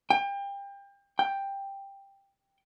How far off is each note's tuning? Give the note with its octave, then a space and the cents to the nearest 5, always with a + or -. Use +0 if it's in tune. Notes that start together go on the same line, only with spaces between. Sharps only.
G5 +30
G5 +10